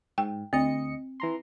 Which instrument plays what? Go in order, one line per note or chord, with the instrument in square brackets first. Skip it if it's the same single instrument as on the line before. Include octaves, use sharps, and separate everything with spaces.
[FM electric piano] G#2 [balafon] G5
[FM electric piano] D2 D#5 C#7 [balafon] C4
[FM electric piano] E3 A#5 C6